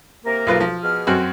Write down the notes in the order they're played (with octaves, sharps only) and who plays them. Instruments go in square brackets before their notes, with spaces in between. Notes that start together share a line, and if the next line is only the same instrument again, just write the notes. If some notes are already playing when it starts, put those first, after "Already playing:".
[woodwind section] C3 A#3 A#4
[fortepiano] B1 F4 B4
F3
[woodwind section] B2 G#4 F6
[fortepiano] F#2 C4 F#4